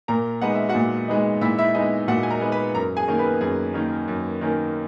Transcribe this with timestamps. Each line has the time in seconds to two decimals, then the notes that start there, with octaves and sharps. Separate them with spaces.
0.08 A#2 A#4 A#5
0.42 G#3 B3 D#4 F#5
0.55 E5
0.69 F#4 F#5
0.75 A#2
1.08 G#3 B3 D#4
1.41 A#2 E4 E5
1.58 E4 E5
1.75 G#3 B3 D#4 D#5
2.08 A#2 F#4 F#5
2.23 G#5
2.30 A#4 A#5
2.41 G#3 B3 D#4
2.52 B4 B5
2.75 F#2 A#4 A#5
2.97 G#4 G#5
3.08 D#3 A#3 C#4
3.19 B3 B4
3.41 F#2 G#4
3.74 D#3 A#3 C#4
4.08 F#2
4.41 D#3 A#3 C#4